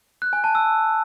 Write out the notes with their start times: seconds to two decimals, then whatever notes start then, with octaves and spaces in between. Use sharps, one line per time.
0.22 F#6
0.33 G#5
0.44 A5
0.55 E6